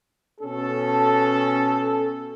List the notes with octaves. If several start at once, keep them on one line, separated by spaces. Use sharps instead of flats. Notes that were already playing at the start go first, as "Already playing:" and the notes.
B2 C#4 A4